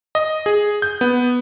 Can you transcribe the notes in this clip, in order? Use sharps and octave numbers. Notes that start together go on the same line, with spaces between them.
D#5
G#4
G6
B3